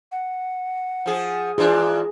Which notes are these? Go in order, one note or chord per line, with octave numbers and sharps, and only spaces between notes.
F#5
F3 G#4
G#2 E3 D4 F4 G#4